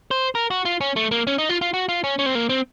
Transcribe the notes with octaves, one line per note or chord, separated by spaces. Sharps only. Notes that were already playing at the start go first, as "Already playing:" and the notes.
C5
A#4
F#4
F4
C#4
A3
A#3
C#4
D#4
F4
F4
F#4
F4
C#4
C#4
C4
A#3
C4